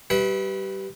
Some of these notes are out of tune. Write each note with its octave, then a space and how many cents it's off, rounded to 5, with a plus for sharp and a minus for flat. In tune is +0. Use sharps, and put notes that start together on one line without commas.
G3 -20 B4 +0 E5 -35